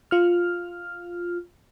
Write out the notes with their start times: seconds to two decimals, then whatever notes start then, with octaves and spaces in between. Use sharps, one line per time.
0.11 F4 F6